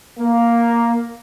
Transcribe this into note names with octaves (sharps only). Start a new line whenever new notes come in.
A#3